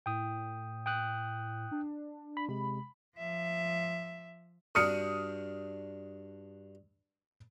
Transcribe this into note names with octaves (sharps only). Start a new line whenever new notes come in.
A2 G5 D#6
G5 D#6 F#6
D4
B5
C3 G#3 B5
F3 E5
G2 D4 F#4 D#6 F6 C#7